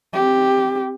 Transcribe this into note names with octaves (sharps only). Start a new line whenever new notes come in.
C4 G4